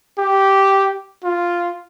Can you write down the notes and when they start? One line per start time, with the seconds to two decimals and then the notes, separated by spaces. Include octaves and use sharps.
0.18 G4
1.24 F4